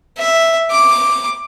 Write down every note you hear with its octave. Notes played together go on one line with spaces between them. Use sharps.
E5
D6